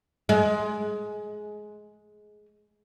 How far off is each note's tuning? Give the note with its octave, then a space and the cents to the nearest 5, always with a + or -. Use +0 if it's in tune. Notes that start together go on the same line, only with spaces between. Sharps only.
G#3 +15